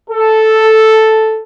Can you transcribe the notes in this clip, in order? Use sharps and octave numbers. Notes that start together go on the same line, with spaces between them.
A4